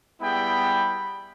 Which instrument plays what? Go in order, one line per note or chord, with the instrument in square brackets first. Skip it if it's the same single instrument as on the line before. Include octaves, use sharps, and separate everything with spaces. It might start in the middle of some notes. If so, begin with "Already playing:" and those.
[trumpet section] G3 B3 E4 G#4 G5 B5